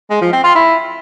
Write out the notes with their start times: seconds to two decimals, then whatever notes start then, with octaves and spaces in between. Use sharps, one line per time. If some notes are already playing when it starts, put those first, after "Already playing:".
0.10 G#3
0.22 F3
0.33 C4
0.44 F4
0.55 E4